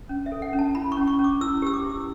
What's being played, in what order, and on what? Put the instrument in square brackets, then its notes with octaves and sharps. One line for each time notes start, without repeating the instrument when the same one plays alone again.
[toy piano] C#4
E5
A4
F#5
C#4
A5
E4 B5
C#6
C#4
C#6
C#4
D6
E4 E6
G4 E6
D6
E4